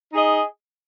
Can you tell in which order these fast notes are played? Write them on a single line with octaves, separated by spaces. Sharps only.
D#4 G#4 D#5